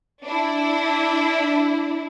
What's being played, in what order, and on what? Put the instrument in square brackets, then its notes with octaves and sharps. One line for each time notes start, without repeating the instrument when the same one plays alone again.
[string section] D4 E4